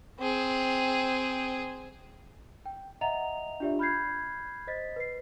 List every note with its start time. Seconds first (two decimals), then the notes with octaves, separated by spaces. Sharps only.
0.19 C4 G#4
2.66 G5
3.01 D#5 E5 F#5 A#5 F7
3.60 D4 F4 G4 D5 E5
3.79 B5 F6 G6 G#6 C7
4.67 C5 D#5 A6 B6
4.96 B4 C7